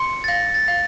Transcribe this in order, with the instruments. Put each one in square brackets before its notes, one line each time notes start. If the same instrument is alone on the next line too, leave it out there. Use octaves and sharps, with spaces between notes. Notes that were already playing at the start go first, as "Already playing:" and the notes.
Already playing: [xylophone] C6 [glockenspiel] C#7
[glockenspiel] A6
[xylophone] F5 [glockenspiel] A#6
[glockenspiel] A6
[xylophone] F5